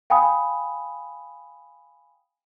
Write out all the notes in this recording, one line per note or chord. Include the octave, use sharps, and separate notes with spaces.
F5 G5 G#5 B5 D#6